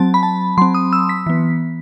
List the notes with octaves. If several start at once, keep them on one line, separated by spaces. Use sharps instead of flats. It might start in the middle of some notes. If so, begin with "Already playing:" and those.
Already playing: F#3 C4 A5
B5
A5
F#3 C4 C6
D#6
E6
B6
E3 B3